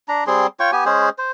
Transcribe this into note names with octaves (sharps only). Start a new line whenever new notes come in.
D4 A#5
G3 C4 G#4 C6
F4 C#5 G5 C#6
B3 G4 G#5
G#3 C#4 G#4 C5
C5